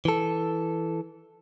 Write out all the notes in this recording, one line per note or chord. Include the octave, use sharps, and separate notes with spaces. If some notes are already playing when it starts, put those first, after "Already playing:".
E3 A4